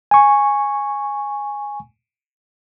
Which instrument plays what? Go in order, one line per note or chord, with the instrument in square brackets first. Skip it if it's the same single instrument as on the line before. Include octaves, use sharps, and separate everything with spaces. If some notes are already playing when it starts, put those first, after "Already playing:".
[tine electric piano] G#5 C#6